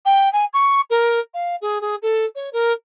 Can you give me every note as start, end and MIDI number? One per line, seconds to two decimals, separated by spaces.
0.06 0.31 79
0.33 0.45 80
0.54 0.81 85
0.90 1.20 70
1.34 1.56 77
1.62 1.81 68
1.81 1.96 68
2.02 2.25 69
2.35 2.50 73
2.53 2.73 70